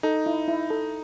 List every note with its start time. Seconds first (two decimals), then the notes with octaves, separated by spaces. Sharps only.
0.03 D#4 A4
0.26 E4
0.48 E4
0.70 A4